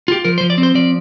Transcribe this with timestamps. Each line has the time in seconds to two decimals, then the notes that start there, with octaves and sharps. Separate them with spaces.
0.08 F4 G4
0.25 F3 A#4
0.38 C5
0.41 F3
0.50 D5
0.58 C4
0.63 C5
0.75 F3 D5